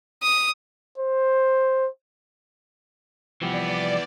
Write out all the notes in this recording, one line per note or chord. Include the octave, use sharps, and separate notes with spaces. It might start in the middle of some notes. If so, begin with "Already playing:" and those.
D#6
C5
C2 E3 F3 B3 G4 D5